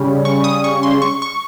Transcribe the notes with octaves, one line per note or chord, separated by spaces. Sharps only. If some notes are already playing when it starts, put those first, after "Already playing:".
Already playing: C#3 G3 C#4
C#6
D#6
C#6
C6
C#6
C#6